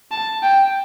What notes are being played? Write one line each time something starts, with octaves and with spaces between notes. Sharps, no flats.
A5
G5